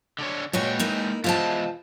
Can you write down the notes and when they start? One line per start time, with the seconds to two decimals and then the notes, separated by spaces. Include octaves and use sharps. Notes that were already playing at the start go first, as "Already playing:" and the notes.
0.19 D3 D4 C#5
0.53 A#2 G#3 F#4 B4 C#5 G5
0.79 A#3 D#4 E4
1.24 E2 G#3 E4 F4 C5 A5